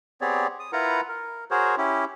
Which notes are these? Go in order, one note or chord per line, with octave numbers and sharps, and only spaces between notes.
B3 C4 G4 G#4 C#5 D5
D#6
E4 F4 A#4 B4 F#5 A#5
A#4
F#4 G#4 A#4 C5 C#5
C#4 E4 G4